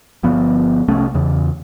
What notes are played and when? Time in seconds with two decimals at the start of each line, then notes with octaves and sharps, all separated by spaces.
0.23 G1 F3 B3
0.88 C2 A3 C#4
1.14 E2 C#3